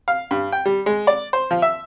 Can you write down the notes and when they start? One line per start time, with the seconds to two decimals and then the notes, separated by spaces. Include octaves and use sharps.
0.08 F5
0.31 G2
0.52 G5
0.66 G3
0.86 G#3
1.07 D5
1.33 C5
1.51 F3
1.62 E5